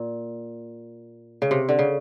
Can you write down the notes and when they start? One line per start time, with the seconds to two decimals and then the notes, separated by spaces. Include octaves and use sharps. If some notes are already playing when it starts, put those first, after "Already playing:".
Already playing: A#2
1.42 C#3
1.51 C3
1.69 D3
1.79 C#3